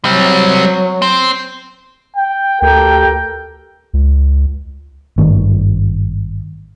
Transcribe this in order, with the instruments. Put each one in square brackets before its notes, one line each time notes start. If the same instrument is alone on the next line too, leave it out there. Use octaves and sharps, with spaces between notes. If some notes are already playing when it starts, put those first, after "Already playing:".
[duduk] F#3 [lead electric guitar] G3 C4
[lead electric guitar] C4
[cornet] G5
[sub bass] D2 [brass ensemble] G4 A4 A#4 [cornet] G5
[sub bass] C#2
[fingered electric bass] G#1 G2 D#3 A3